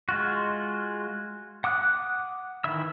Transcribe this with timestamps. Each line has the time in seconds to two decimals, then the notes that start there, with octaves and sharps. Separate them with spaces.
0.09 G#3 F4 F#4
1.64 F#5 D6 D#6 F#6
2.64 D#3 E3 E4 E5 E6